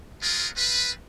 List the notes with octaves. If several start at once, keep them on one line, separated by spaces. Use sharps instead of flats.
B3 C4 F4 G#4 A#4
C4 F4 B4